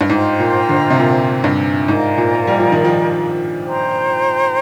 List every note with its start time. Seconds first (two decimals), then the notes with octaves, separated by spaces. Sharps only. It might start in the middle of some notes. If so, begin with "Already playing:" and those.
0.01 G2
0.09 G#2 F4 C5 G5 A#5
0.40 A#2
0.69 D3
0.90 C3
0.99 A#2
1.44 G2
1.88 G#2 F4 A#4 D5 G#5
2.17 A#2
2.47 G3
2.60 F3
2.72 D#3
2.85 F3
3.66 C5 G5 A#5